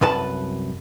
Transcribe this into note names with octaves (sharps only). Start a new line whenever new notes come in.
C2 F#2 B4 A5